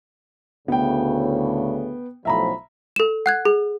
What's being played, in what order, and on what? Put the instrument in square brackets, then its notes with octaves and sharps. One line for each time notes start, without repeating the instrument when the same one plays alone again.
[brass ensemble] D2 A2 C#3 [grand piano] B3 G5
[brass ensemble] B1 A2 F3 [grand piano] E5 A#5 B5
[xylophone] A4 E7
F#5 F#6 G#6
G#4